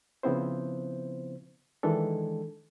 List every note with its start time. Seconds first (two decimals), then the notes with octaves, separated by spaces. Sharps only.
0.23 C#3 F3 B3 C4 E4 C5
1.83 D#3 E3 G#3 D4 A4